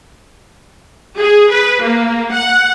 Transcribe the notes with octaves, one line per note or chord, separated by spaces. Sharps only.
G#4
B4
A#3
F#5